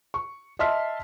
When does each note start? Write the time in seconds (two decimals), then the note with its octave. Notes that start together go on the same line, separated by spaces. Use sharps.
0.14 C#6
0.59 D#5 E5 A5 C6 F6 B6